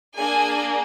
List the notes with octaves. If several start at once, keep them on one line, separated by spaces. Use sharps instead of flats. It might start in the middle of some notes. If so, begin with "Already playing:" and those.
A#3 D4 G#4 G#5